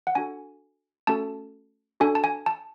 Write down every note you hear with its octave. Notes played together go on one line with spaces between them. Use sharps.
F#5
D4 F#4 A4 G#5
A3 C#4 F#4 A4 A5
D4 F#4 A4 G#5
A5
G#5
A5